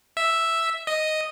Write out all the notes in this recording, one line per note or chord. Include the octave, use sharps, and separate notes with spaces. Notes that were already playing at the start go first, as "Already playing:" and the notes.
E5
D#5